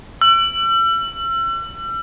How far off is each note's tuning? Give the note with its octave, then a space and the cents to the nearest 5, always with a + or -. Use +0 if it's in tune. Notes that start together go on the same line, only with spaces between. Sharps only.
E6 +40